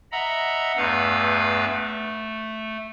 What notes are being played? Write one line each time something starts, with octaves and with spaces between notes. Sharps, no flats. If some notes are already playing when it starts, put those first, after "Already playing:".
D#5 E5 F#5 A#5 B5 E6
E2 G2 A3 B4 F5 E6
A3